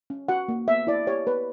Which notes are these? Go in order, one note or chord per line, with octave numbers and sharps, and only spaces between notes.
C#4
F#4 F#5
A#3
B3 E5
E4 D5
G4 C#5
B3 B4